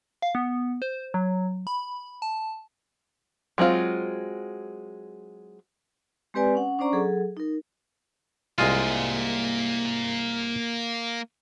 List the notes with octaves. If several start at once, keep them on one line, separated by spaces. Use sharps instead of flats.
F5
B3
C5
F#3
B5
A5
F#3 G#3 C4 F4
G#3 C4 G4 B4 D5 G#5
C#4 F#5
C#4 D4 C5 D5 A#5 C#6
F#3 G#4 A4
D#4 A#4
C2 G#3 A#3 F4 G#5